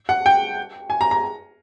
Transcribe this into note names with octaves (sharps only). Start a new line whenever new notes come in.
F#5
G5
G#5
A#5
A#5